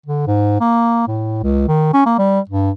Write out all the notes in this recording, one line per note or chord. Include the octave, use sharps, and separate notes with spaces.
D3
G#2
A#3
A2
C#2
D#3
C#4
A#3
G3
G2